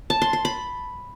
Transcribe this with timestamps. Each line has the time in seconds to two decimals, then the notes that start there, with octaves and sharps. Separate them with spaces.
0.10 A5
0.22 C6
0.33 C6
0.45 B5